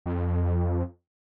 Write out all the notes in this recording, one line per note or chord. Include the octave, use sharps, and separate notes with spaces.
F2